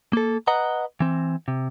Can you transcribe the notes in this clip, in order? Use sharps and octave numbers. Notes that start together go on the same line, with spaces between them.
A#3 A4
B4 D#5 F#5 A#5
E3 C4
C3